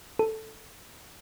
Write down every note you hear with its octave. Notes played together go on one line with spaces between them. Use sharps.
A4